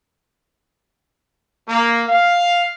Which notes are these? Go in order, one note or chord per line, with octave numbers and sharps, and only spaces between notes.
A#3
F5